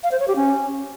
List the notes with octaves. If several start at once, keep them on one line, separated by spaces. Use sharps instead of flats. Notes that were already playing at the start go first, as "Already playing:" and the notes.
F5
C5
C#5
G4
C#4